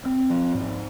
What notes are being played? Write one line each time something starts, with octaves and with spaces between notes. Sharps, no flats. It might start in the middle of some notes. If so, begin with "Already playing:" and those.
C4
F3
G#2